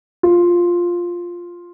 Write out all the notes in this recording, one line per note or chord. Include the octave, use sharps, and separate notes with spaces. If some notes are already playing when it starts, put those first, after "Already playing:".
F4